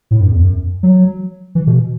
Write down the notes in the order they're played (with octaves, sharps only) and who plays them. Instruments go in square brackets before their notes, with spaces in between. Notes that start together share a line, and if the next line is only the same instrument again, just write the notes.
[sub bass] A2
F#2
E2
F#2
F#3
E3
B2